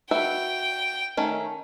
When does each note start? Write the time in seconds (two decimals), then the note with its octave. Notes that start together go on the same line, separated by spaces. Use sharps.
0.11 F#4 B4 E5 G5
1.17 D#3 A3 C#4